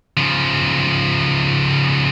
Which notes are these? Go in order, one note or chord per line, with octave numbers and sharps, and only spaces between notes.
C#3 F3